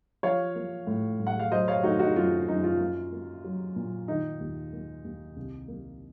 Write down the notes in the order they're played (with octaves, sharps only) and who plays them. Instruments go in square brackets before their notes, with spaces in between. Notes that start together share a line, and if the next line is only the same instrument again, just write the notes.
[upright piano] F3 C#5 F5
A#3
A2
A2
F#5
F5
F#3 C5 D#5
C#5 F5
A3 D#4 F#4
D#4 F#4
F#2 F4
F#2 D#4
F4
A#3
A#3
F#3
A#2
D#3 D#4
D#2
A#3
D#2
C2
A#3